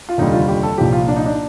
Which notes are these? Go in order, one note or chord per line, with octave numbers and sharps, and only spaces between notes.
F4
F1 D#2 D3 G3 D#4
F4
G4
A4
C2 A#2 F3 G4
F4
D4
D#4
D4